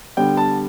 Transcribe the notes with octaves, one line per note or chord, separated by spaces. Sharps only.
D3 G3 B3 G5
A5